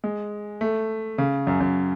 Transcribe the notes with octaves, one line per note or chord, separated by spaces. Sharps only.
G#3
A3
C#3
F#2
F#2